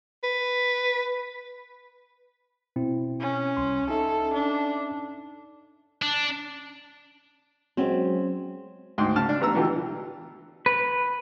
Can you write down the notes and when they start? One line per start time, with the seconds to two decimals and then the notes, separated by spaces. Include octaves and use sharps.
0.24 B4
2.76 B2 C4 E4
3.20 C#4
3.57 C2 C6
3.89 C#4 D#4 A4 E5
4.33 D4
6.02 D4
7.77 F#3 G#3 C4 C#4
8.98 D2 G#2 G5 C6
9.16 C#3 A5 F6
9.29 D4
9.41 A1 B3 A#5 E6
9.55 B2 D3 E3 F4 G4
10.66 B4